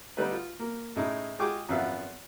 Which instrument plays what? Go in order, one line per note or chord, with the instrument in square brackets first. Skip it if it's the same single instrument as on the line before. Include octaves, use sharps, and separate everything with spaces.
[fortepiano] D3 G3 A3 D#4 B4
F4
A#3
A2 C#3 D#4 E4
G#3 F4 G#4 G5 C#6 D6
G#1 F#2 F3 B3 E5 F5